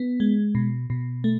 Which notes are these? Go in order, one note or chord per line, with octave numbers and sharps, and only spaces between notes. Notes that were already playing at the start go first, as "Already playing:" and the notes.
Already playing: B3
G#3
B2
B2
A3